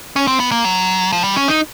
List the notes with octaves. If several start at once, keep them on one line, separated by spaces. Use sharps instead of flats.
C#4
C4
B3
A#3
F#3
F3
G3
C#4
D#4